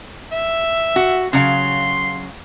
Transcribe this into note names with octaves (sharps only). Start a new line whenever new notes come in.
E5
F#4
C#3 F#3 F5 C6